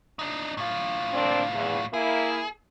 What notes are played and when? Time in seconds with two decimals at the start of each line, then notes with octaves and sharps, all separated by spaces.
0.19 D4 D#4
0.57 A2 F4
1.14 A#3 C4 D4
1.54 E2
1.94 A#3 E4 G#4